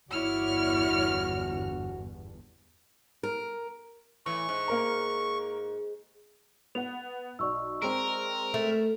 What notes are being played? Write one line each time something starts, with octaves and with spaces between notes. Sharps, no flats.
G1 E2 G2 E4 F#4 C#5 D5 F6
A#4
A2 E3 C#6
G#2
A#3 A#4 A#5
B3 F#5 F7
B1 D5 C#6 E6
G#3 C4 A#4
A3